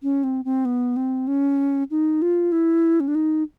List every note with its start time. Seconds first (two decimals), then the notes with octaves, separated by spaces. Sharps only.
0.03 C#4
0.24 C4
0.45 C4
0.65 B3
0.96 C4
1.27 C#4
1.91 D#4
2.22 F4
2.52 E4
3.00 C#4
3.08 D4
3.15 D#4